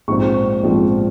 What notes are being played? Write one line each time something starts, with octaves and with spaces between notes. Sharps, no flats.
A#1 G#2 F3 G#3 C4 C#6
A#1 G#2 F3 G#3 C4